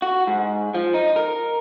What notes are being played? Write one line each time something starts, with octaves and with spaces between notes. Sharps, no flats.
F#4
G#2
F3
D#4
A#4